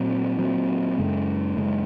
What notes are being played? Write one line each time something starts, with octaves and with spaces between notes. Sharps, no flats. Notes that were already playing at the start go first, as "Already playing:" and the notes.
Already playing: A#2 F#3 C4
A#2 F#3 C4
F#2 C#3 G#3
F#2 C#3 G#3